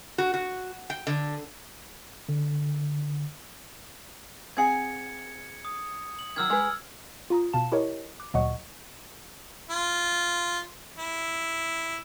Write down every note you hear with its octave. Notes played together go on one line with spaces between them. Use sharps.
F#4
F#4
G5
D3
D3
C4 G#4 F#5 G#6 C#7
D#6
F#7
D#3 F#3 E6 F6 G#6
G#3 B4
F4 A#5 D#6
B2 F5 A5 E7
E4 G4 A#4 C#5 D#5
D6 F#6
D2 A#2 F#3 D#5 F#5 C#6
F4
E4